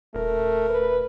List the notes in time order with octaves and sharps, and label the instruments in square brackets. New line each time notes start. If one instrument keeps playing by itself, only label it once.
[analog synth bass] D#1 [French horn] A3 [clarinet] A#4
[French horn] B4